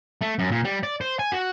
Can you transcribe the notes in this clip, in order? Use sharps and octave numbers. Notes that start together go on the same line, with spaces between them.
A3
F#2
A#2
G3
D5
C5
G#5
F#4